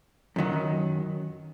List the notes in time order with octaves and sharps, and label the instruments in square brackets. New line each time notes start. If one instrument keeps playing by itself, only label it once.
[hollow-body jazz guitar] F#2 D#3 F#3